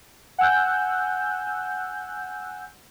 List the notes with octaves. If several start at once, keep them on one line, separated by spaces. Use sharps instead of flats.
F#5 G#5 E6 F#6 G6